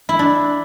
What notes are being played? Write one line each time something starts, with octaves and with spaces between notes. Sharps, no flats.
E4
D4